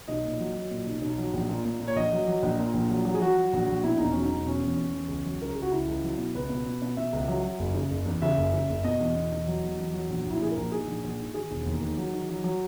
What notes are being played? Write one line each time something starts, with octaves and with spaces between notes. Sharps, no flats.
B1 D#5
A#2
F#3
F#3
A#2
B1
B1
F#3
A#1
A#2
A#2
A#2
C#5
A#1 D#5
F#3
F#3
A#1
A#2
A#1
F#3
F#3
G#4
F#3 F#4
F#3
A#1
A#1
B2 E4
E1 D#4
C#4
F#3
D#4
E1
B2 C#4
E2
E2
E2
C#2
F#3
C#2 A#4
C#2 G#4
F#4
C#2 E4
C#2
F#3
B2
C#2 B4
B2
B2
B2
B2 E5
C#2
F#3
F#3
F#1
C#3
F#1
E2
C#3 E5
F#1
C#3
F#1
B2 D#5
E2
B2
E2
F#3
E2
E2
F#3
A#1
A#1 E4
A#1 G#4
A#4
A#1
G#2 G#4
A#1
A#1
G#2
D#3 G#4
E1
D#2
D#3
F#3
D#3
F#3
F#3